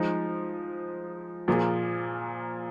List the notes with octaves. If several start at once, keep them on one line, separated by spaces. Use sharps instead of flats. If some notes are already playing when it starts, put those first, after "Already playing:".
Already playing: F3 G#3 D#4
A#2 F3 A#3 F4 G#4